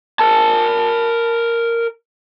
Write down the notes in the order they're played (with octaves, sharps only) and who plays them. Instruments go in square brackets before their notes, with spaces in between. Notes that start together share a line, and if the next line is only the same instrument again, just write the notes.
[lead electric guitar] A#4 A5